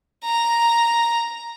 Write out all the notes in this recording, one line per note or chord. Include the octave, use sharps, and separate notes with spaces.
A#5